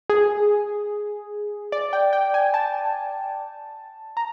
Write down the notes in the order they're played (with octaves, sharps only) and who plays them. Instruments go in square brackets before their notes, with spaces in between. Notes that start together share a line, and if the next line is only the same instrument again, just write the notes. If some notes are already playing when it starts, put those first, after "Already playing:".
[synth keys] G#4
D5
G5
G5
G#5
A5
A#5